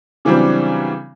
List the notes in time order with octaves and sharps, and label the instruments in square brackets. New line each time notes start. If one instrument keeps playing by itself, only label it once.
[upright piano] C#3 E3 F#3 G3 C4 D4